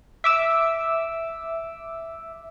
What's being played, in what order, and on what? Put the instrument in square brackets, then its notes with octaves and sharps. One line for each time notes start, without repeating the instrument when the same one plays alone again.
[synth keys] E5 D6 E6